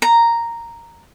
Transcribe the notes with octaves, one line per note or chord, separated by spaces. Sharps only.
A#5